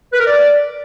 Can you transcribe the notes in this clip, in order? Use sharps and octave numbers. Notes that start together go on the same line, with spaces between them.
B4
A#4
D5